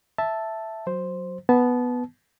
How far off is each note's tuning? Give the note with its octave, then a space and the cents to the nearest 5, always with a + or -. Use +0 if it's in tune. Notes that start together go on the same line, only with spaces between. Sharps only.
E5 +0 A5 +0
F#3 -5 C5 +0
B3 +0 A5 -25